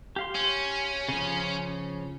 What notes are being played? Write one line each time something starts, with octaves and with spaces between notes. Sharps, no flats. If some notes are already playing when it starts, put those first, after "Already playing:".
G4 F5 C6
C#4
C#3 F3